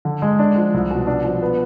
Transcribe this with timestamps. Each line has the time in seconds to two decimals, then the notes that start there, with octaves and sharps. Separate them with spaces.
0.05 D3
0.22 G#3
0.39 D4
0.56 F3
0.74 C2
0.91 B2
1.07 D4
1.24 F3
1.42 B3